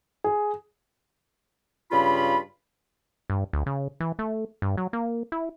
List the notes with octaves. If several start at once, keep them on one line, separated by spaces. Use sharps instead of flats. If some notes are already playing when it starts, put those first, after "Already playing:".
G#4
G2 C#3 F4 B5
G2
D2
C#3
E3
A3
G2
F#3
A#3
E4